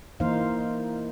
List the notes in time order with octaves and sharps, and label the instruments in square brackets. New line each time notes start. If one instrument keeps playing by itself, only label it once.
[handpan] E3 A#3 D#4 A#4 C5 F5